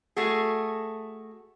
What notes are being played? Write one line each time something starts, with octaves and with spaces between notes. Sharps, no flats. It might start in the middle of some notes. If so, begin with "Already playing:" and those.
A3 F#4 G#4